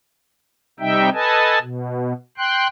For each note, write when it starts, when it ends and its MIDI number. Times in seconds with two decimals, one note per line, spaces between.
0.80 1.09 48
0.80 1.09 55
0.80 1.09 63
0.80 1.09 76
0.80 1.09 79
1.14 1.59 69
1.14 1.59 71
1.14 1.59 75
1.14 1.59 80
1.14 1.59 81
1.61 2.13 47
2.38 2.67 79
2.38 2.67 84
2.38 2.67 90